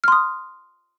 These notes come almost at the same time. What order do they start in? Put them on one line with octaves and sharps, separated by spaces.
F6 C6 D#6